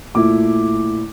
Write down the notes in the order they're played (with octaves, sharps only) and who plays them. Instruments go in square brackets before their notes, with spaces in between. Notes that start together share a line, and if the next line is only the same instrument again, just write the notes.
[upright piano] A#2 A3 E4 D6